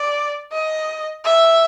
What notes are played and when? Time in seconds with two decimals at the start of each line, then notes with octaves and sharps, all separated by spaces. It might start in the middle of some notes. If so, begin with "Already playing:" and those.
Already playing: D5
0.52 D#5
1.24 E5